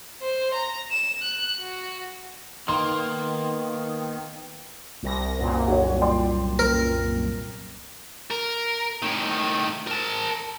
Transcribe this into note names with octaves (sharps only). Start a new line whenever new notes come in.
C5
A#5
E7
F#6
F#4
D#3 A#3 B3 C6
C2 A#6
C2 F#2 A#2
F#4 C#5
D5 G5 C6
A#4
A#4
A2 D#3
A#4 A5